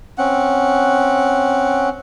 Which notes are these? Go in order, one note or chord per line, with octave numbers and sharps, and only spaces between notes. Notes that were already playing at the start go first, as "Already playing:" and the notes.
C4 C#4 F#5